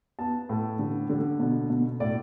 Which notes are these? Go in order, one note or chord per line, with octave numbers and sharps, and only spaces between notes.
B3 A5
A2
D3
D3
B2
B2
A2 D5